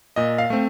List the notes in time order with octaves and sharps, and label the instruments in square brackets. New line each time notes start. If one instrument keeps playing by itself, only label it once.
[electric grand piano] A#2 D#5
F5
A3 C4